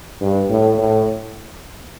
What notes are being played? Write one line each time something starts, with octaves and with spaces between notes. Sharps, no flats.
G2
A2
A2